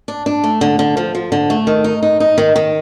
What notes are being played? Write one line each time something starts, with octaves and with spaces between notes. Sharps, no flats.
D4
D4
A3
D3
D3
F3
F3
D3
A3
D#3
D#4
D#4
D#4
D#3
D#3